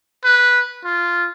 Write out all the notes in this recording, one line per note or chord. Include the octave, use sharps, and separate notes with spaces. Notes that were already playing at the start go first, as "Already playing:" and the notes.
B4
F4